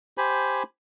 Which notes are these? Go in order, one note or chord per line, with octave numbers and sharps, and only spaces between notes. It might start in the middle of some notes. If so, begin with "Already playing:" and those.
G4 C5 G#5 B5